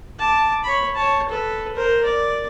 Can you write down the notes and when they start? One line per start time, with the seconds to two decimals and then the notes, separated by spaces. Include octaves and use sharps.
0.19 A5 D6
0.64 C#5 B5
0.95 C#5 A5
1.29 A4 B4
1.75 A#4 C5
2.04 D5